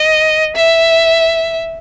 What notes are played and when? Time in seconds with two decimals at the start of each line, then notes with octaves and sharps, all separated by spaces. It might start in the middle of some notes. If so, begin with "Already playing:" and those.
Already playing: D#5
0.56 E5